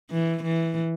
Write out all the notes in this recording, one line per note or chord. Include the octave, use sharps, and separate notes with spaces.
E3
E3